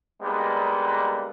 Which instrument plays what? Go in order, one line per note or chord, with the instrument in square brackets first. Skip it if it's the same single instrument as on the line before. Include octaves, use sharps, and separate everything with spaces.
[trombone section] D3 G3 G#3 A#3 B3 D#4